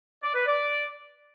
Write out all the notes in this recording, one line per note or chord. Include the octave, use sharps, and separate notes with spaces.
D5
B4
D5